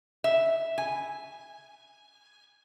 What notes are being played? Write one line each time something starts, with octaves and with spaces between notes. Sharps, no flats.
E5
G#5